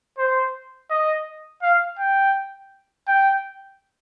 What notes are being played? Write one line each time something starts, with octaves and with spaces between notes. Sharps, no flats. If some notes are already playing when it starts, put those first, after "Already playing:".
C5
D#5
F5
G5
G5